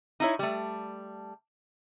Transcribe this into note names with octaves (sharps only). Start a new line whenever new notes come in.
D#4 E4 C#5
G3 A3